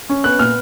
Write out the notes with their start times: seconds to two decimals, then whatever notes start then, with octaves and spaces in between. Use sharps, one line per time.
0.10 C#4
0.24 B3 F#6
0.39 A#2 F6